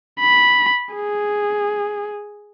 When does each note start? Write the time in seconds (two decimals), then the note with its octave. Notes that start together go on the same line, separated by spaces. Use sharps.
0.20 B5
0.95 G#4